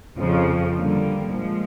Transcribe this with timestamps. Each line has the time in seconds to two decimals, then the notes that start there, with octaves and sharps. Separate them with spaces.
0.18 F2 C#3 F3
0.76 D3 G3 A#3
1.32 A#2 F3 G#3